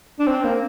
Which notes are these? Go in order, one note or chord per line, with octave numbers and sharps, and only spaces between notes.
D4
C4
A#3